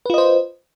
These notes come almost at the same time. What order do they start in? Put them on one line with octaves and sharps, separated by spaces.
B4 F4 D#5 C5